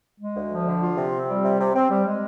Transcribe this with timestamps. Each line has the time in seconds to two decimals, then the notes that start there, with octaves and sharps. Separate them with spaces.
0.20 G#3
0.36 D2
0.51 F3
0.67 D3
0.82 F4
0.97 C3
1.13 C4
1.29 G3
1.44 C3
1.60 C3
1.75 C4
1.90 G3
2.06 G#3